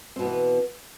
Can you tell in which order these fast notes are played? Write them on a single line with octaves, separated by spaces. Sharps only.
C4 B2 B3 E3